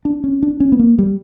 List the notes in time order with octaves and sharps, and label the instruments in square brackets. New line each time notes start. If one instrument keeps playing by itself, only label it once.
[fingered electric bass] D4
C#4
D4
C#4
B3
A#3
G3